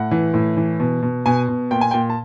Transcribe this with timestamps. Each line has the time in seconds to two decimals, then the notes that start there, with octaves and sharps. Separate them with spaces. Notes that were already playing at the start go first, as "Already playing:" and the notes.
Already playing: A2 F#5
0.11 E3
0.34 A2
0.57 E3
0.80 B2
1.03 B2
1.26 B2 G#5
1.48 B2
1.71 A#2 G5
1.81 G#5
1.91 G5
1.94 A#2
2.10 A5